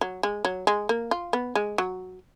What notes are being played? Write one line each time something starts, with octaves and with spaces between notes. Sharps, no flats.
F#3
G#3
F#3
G#3
A#3
F4
B3
G#3
F#3